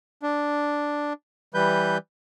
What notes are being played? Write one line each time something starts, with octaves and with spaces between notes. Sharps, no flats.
D4
E3 G3 B4 G6